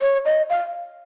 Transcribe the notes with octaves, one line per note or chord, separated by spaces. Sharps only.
C#5
D#5
F5